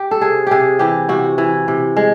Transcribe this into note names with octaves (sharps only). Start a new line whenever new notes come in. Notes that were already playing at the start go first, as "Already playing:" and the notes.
Already playing: G4
A4
C3 G#4
C3 G4 G#4
E3 G4
C3 F#4
E3
C3
G#3